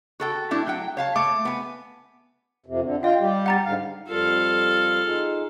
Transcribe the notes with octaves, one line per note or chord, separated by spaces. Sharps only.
F#4 A4 G5
A3 D4 E4
F#3 F#5 G5
C#5 F5 A5
A3 D6
B3 G#5
F2 C3
D3
F4 D#5 F5 G5
G3 G4
F#5 A#5 A6
G#2 D3 F5
F2 G3 F4 A4 F5
D#4 F4 G#4